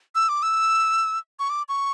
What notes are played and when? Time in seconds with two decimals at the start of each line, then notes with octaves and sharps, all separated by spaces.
0.15 E6
0.29 D6
0.43 E6
1.39 C#6
1.50 D6
1.69 C#6